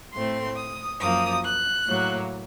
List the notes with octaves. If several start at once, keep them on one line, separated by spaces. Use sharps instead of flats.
A2 A3 C4 C6
D#6
F#2 F3 A#3 D#6
F#6
A2 F#3 A#3